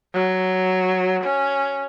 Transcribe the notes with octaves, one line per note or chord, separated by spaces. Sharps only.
F#3
C#4